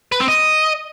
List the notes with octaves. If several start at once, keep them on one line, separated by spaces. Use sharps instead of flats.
B4
C4
D#5